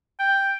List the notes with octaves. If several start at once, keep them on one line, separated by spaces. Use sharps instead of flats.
G5